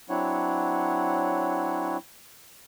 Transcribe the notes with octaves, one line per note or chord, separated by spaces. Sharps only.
F#3 C4 D4 E4 C#5 F#5